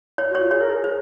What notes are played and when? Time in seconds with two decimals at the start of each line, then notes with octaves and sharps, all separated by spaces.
0.18 C#5
0.30 F#4
0.35 C#5
0.40 F4
0.51 G#4 C#5
0.60 A#4
0.70 G#4
0.84 C5